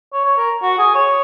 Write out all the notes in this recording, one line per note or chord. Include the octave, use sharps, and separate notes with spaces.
C#5
C#5
A#4
F#4
G#4
C#5